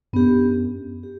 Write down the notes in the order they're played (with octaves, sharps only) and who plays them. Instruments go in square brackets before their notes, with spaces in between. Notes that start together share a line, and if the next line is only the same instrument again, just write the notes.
[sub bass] F#2 [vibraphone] B3 D4 G4
[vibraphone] G4